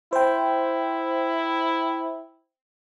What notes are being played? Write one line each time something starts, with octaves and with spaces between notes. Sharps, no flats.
E4 C5 G5